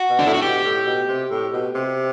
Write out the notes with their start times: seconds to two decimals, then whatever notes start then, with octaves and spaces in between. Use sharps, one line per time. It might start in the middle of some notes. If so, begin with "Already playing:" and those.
Already playing: F#4
0.10 B2
0.19 D4
0.26 A2 E4
0.34 F#4
0.42 B2 G4
0.65 A2
0.86 B2
1.09 C3
1.31 A2
1.53 B2
1.75 C3